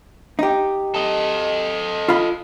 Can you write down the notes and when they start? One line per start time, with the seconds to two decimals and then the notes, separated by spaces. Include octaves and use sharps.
0.39 D#4 G4
0.95 A4 D#5
2.08 F4 F5 B5